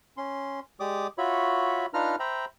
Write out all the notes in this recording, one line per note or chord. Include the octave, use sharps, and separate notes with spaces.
C#4 C6
G#3 G4 D5 D6 D#6
F4 F#4 C#5 E5 B5
D4 D#4 F4 B4 A#5 F6
C5 E5 G5 A#5 B5